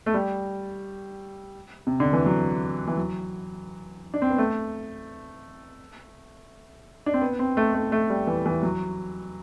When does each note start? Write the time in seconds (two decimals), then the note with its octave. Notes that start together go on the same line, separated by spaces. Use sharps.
0.06 A3
0.14 G3
1.87 C3
2.00 D3
2.13 E3
2.26 F#3
2.87 E3
2.97 F#3
4.14 D4
4.22 C4
4.30 B3
4.38 A3
7.06 D4
7.14 C4
7.22 B3
7.39 C4
7.57 A3
7.74 A3
7.92 A3
8.10 G3
8.27 E3
8.46 E3
8.63 F#3